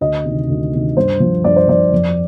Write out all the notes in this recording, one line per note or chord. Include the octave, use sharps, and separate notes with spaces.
D2 D#5
C3 D#3
D2
C3 D#3
G2 C5
F3
G2 D5
C5
F3 D5
F2